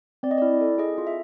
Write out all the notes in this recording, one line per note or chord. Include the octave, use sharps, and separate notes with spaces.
C4 D5
D#5
E4 D5
A4
G#4 D#5
F4
E5